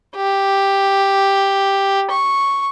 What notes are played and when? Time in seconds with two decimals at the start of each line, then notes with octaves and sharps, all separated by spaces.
0.16 G4
2.10 C#6